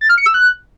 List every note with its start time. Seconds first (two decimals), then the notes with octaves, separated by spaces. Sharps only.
0.01 A6
0.09 F6
0.18 C#7
0.26 E6
0.34 F#6